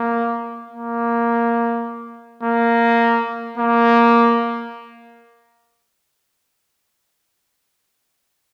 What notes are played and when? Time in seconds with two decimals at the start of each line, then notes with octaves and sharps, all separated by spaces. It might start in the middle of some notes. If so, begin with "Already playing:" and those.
Already playing: A#3
0.71 A#3
2.43 A#3
3.58 A#3